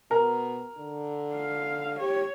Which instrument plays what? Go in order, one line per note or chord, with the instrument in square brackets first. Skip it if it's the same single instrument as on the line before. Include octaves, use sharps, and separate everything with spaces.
[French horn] B2 [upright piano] A#4
[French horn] D3
[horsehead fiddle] F5
[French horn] G4 [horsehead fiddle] C#5